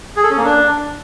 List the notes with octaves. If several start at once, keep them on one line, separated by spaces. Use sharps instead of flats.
G#4
A4
C#4
A#3
D4